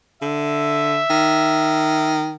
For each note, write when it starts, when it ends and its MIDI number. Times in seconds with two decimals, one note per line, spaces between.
0.22 0.99 50
0.22 2.15 76
1.10 2.34 51